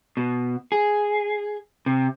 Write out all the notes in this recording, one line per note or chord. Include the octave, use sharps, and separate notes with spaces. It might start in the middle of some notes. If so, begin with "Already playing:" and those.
B2
G#4
C3